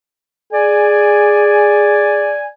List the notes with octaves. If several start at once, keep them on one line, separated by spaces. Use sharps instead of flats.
G#4 D5 G#5